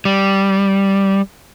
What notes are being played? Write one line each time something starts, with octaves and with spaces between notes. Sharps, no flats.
G3